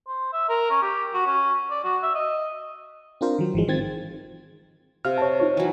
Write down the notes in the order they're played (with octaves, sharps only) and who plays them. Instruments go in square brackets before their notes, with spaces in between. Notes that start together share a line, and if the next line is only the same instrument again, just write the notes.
[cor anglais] C5
E5
A#4
C#4
G4
F#4
C#4
D5
F#4
E5
D#5
[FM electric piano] C4 D4 F4 A#4 C5
D#3 F#3
G#1 E3 F3 G#3
D#3 C4 G#6 A6
[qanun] C3 [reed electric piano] G4 F5 F6
[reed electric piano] C#5 A5
D#4 F4 C#5
[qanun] E3 F#3